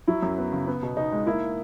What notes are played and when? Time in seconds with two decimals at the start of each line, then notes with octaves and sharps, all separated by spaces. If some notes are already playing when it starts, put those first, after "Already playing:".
0.07 F#3 E4
0.22 F#2
0.38 B3
0.53 C#3
0.67 B3
0.83 B2
0.97 B2 D#4
1.12 G#3
1.26 A#3 E4